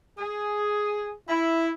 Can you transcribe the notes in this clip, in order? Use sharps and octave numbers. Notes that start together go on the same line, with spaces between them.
G#4
E4